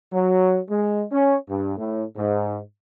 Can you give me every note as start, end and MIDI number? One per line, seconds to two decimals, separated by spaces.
0.12 0.58 54
0.69 1.04 56
1.12 1.35 61
1.48 1.77 43
1.77 2.03 45
2.17 2.57 44